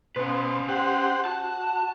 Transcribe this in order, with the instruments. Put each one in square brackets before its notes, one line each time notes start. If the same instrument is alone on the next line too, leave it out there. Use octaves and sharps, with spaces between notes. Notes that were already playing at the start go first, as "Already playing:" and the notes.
[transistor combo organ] B2 C5 [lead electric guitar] C#4 B4
[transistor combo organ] G4 C5 F#5
[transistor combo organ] F#4 [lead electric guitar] A5